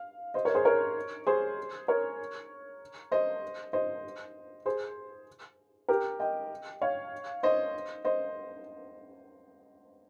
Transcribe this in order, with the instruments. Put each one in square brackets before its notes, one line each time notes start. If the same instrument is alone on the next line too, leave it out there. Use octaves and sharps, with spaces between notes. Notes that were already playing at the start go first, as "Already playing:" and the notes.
Already playing: [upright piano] F5
C5 D#5
A#4 C#5
G#4 C5
A#4 C#5
G#4 C5
A#4 C#5
C5 D#5
C5 D#5
G#4 C5
G4 A#4
D#5 G5
C#5 F5
C5 D#5
C5 D#5